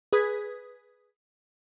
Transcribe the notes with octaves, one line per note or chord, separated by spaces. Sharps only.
G#4 B4 D#6 G#6 B6